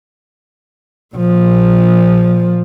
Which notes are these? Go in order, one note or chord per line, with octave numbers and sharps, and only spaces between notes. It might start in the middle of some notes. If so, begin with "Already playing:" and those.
A#2 F3